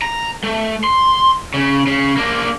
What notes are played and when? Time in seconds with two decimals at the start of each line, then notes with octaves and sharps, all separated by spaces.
0.02 A#5
0.44 A3
0.84 C6
1.54 C#3
1.87 C#3
2.17 A#3 D4